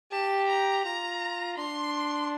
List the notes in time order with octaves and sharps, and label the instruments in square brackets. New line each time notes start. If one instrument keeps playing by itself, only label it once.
[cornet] G4 [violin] A5
[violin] A#5
[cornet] F4 [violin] A#5
[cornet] D4 [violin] C6